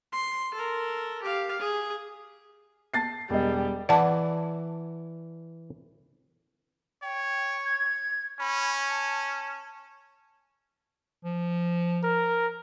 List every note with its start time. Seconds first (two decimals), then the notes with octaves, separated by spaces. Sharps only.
0.12 C6
0.54 A4 A#4
1.22 G4 F5
1.59 G#4
2.94 A5 A6 C7
3.30 E1 G3 D#5
3.89 E3 D5 F#5 A5
7.03 C#5 G5
7.65 G#6
8.40 C#4 B5
8.90 A5
11.25 F3
12.03 A#4